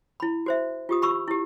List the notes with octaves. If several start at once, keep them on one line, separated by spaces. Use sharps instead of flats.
E4 B5
F#4 C5 E5
F4 G4 D#6
G4 B5 C#6 E6
E4 G4